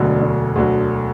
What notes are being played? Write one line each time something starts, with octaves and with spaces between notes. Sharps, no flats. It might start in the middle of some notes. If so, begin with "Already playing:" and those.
Already playing: E1 D2 D3 F#3
E1
D2 D3 F#3